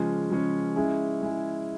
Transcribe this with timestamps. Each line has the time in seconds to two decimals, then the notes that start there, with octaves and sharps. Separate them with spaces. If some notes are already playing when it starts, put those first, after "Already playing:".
Already playing: C#3 F3 G#3 C#4
0.30 C#3 F3 G#3 C#4
0.76 G#3 C#4 E4 G#4
1.22 G#3 C#4 E4 G#4